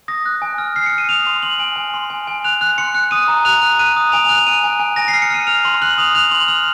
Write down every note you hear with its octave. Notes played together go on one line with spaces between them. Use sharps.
D#6 A#6
F#6
G#5
F6
F6 C7
C#7
F6
D#7
D#6 F7
C6
C6 F#7
G#5
G#5
C6
G#5
G#5
F#6 F7
F#6
C6 C#7
F#6
D#6 D#7
A#5
F#6 F7
F#6
F#6 D#7
D#6
G#5 F7
F7
F#6
F7
G#5 D#7
G#5
G#5
G#5 A#6
C7
F6
C#7
F6 D#7
F6 F7
C6
F#6 F#7
D#6 F7
F#6 F7
C6 F#7
F6 F7